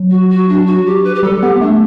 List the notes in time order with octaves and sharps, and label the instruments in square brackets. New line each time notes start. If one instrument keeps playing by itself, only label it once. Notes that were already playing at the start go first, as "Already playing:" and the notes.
Already playing: [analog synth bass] F#3
[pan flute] F#4
F#4
D4
F#4
G4
B4
G4
[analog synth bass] G3 [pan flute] A4
[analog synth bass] B3 [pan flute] G4
[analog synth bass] A3 [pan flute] D4